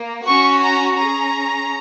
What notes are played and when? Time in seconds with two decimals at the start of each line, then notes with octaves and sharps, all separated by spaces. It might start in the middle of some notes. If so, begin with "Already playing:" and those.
Already playing: A#3
0.25 C#4 F#4 C#6
0.61 A#5
0.98 C#4 G#4 A#5